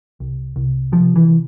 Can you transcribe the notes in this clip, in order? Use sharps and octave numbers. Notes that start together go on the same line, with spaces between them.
C2
C2
C3 F3
E3